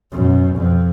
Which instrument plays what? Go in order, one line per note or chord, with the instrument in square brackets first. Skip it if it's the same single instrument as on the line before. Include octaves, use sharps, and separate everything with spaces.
[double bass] F#2 B2
F2